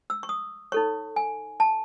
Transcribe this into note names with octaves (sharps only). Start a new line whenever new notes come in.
E6
C#6
D#6
D#4 A4 C#5 C#6
G#5
A5